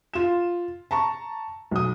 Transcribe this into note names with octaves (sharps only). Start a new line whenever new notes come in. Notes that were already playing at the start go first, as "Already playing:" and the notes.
F4 E7
A5 A#5 C#6
B1 D#6